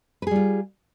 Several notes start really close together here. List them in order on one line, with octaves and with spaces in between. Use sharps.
B4 G#4 G3 F4